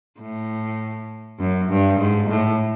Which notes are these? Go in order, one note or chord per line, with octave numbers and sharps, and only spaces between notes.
A2
F#2
G2
G#2
A2